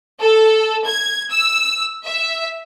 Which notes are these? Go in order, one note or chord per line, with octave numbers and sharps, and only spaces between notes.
A4
G#6
E6
E5